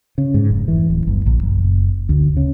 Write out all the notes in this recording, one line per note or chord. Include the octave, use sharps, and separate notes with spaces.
C#3
G#2
F1
E3
D1
G1
A#1
F#1
D2
C#3